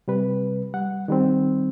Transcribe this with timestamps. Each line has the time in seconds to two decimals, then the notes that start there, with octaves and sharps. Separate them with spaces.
0.08 C3 G3 B4
0.74 G3 F#5
1.08 D#3 G3 C4